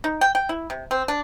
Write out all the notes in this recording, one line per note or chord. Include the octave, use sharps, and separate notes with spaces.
D#4
G5
G5
E4
C3
C4
D4